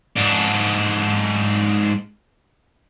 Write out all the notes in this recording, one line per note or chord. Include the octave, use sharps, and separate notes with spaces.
G#2 D4